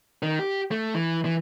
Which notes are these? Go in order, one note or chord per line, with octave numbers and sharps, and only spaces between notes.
D#3
G4
A3
E3
E3